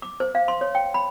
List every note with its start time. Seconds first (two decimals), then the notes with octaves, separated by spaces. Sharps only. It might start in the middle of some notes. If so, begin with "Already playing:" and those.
0.02 D6
0.20 C5
0.35 F5
0.48 C6
0.61 C#5
0.75 G5
0.94 B5